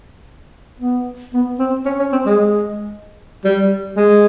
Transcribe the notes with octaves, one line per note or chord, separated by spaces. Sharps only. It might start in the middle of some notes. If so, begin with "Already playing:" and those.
B3
B3
C4
C#4
C#4
C4
G#3
G3
G#3